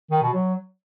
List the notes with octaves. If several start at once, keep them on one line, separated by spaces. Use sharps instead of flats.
D#3
B2
F#3